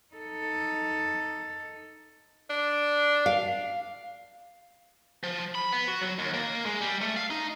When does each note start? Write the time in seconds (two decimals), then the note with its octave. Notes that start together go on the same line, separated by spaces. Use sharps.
0.14 D#4 A4
2.50 D4
3.26 F5
5.24 F3
5.55 B5
5.72 B3
5.88 F#4
6.01 F#3
6.19 D#2
6.34 A#3
6.66 G#3
6.81 G3
7.01 A3
7.17 F5
7.30 D#4